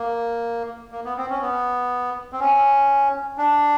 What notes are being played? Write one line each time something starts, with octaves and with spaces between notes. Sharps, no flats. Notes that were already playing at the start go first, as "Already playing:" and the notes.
Already playing: A#3
A#3
B3
C4
C#4
B3
C4
C#4
D4